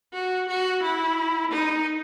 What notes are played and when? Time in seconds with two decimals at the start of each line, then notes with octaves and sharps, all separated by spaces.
0.14 F#4
0.48 F#4
0.83 E4
1.51 D#4